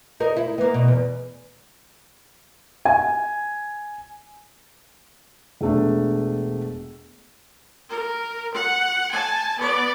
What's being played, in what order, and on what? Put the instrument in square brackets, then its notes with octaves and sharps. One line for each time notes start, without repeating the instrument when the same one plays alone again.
[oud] D#4 A#4
E4
A#3 B3
B2
E2
[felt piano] G#5
E1 A3 D4
[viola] A#4
F#5
G#5 A5
B3 D5